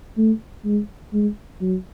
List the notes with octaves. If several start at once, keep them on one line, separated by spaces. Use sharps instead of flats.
A3
G#3
G#3
F#3